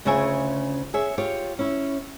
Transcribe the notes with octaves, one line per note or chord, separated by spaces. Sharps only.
D2 C#3 F4 C#5 E5 G#5
G#4 C#5 E5
F4 G4 C#5
C#4 E4